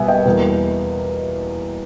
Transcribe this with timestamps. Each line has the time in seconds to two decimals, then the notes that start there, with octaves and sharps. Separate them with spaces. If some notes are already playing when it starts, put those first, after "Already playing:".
Already playing: B2 G3 B3 E5 G#5
0.08 D#5 G5
0.25 E2 B2 G3 A#3